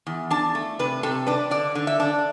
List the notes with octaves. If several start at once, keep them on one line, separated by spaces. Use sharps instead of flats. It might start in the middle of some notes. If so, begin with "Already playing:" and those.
E2
D4 A5
A3
C3 B4
C3 A4
D4 B4
D3 D5
D3
E5
D4